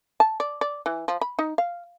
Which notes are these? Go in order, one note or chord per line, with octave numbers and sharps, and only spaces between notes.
A5
D5
D5
E3
F3
B5
D#4
F5